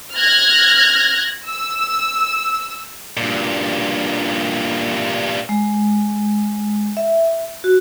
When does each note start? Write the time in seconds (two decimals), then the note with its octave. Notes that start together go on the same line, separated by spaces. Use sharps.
0.15 F6 F#6 G#6 A#6
1.48 E6
3.17 G2 A#2
5.49 G#3
6.97 E5
7.64 F#4